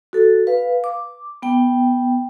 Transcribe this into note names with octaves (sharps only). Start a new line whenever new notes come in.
F#4 A4
B4 F5
D6
B3 G5